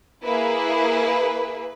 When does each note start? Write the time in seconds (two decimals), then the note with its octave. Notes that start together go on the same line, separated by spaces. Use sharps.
0.23 A#3 E4 G#4 B4